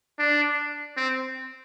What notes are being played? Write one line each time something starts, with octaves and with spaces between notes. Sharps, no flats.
D4
C4